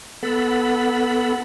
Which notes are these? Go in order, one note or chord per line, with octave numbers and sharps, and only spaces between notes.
B3 A4 B5